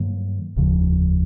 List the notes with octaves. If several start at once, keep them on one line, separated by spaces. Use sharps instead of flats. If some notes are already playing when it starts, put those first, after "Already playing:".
Already playing: G2 D#3 F#3 A#3
F1 D#2 C#3 F3